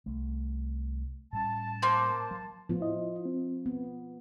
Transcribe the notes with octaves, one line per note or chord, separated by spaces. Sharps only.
C2 A3
A2 G3 C#4 A5
A#3 C5
F#3
A2 F3 B3 F4
E4 D#5
C4
B3